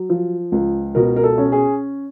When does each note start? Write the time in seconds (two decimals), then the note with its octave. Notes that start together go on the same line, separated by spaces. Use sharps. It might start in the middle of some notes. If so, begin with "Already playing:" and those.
Already playing: F#3
0.10 F3
0.52 C#2
0.95 B2 A#4
1.16 A#4
1.23 A4
1.38 C#4
1.52 G#4